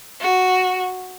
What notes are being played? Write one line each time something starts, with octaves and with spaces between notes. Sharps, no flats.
F#4